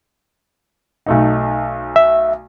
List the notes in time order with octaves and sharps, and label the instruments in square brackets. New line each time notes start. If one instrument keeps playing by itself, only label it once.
[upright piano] B1 A3 D#4
[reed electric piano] E5